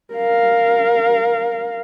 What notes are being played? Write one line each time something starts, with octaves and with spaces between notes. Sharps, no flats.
A#4 F5